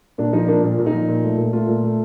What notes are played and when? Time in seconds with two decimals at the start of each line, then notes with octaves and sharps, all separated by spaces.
0.18 A#2 D4
0.33 F3 D#4
0.48 A#3 D4
0.64 A#2
0.79 A#2
0.86 D#4
0.93 F3
1.09 A#2
1.23 A3
1.38 A#2
1.53 A3 F4
1.68 A#2
1.84 A3